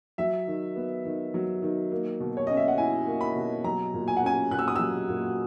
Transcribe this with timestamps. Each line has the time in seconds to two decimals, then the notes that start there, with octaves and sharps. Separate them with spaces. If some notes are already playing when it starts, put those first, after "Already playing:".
0.18 F#3 E5
0.47 D#3
0.76 B3
1.05 D#3
1.34 F#3
1.62 D#3
1.92 A#3
2.20 B2
2.37 C#5
2.47 C#4 D#5
2.57 E5
2.68 F#5
2.78 E4 G#5
3.07 A#3
3.21 B5
3.36 B2
3.64 F#3 A#5
3.94 A#2
4.08 G#5
4.17 F#5
4.22 C#4 G#5
4.50 A#2 F#6
4.59 E6
4.68 D#6
4.76 F#3 E6
5.09 A#2